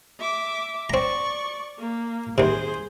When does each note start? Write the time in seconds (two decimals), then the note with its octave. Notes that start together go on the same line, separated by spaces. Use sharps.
0.20 E5 D6
0.90 C4 D5 A#5 C#6
1.79 A#3
2.38 D#2 C3 G#4 C5